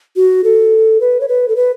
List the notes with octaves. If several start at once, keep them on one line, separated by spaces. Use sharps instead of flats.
F#4
A4
B4
C#5
B4
A4
B4